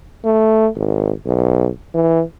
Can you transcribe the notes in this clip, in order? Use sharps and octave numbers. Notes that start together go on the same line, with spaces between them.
A3
G#1
B1
E3